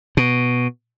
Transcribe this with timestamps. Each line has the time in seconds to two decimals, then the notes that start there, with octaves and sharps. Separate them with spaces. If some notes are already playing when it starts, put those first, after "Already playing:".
0.17 B2